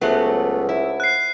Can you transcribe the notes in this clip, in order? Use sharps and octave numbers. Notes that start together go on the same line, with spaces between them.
C#2 F#3 A3 B3 C5 F#5
E4
F#6 C7